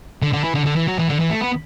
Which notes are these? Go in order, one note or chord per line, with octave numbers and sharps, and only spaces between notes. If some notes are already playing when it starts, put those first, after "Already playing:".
D3
D3
E3
D3
D3
E3
F#3
E3
D3
E3
A3
B3